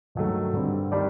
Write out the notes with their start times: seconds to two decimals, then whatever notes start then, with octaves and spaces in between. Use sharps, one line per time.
0.15 G2 D#3 F#3 A3
0.53 G2 D3 G3 C4
0.92 D#3 G3 D4 G4 D5